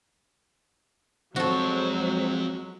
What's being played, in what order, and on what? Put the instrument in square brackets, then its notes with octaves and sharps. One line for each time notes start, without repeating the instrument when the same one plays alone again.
[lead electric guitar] F3 C4 [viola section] F#3 G#3 [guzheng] F#4 A4 [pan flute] C5